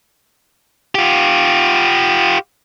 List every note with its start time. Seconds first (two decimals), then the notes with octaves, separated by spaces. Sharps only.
0.95 F4 G4